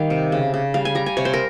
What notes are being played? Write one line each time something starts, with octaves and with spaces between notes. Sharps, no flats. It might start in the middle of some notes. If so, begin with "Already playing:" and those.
Already playing: D#3 G3 F5 G5
C3
C#3
C#3
G3 F5
G#5
G3 A#5
G#5
C3 C#5
C5
A#4